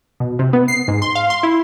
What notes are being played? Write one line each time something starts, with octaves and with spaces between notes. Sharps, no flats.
B2
C3
B3
C7
G#2
C6
F5
C6
E4